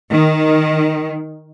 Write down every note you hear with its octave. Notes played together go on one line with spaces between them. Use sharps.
D#3